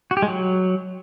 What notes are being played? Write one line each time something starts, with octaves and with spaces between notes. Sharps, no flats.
F#4
G4
G#3
F#3